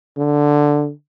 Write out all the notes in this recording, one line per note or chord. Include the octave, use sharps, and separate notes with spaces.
D3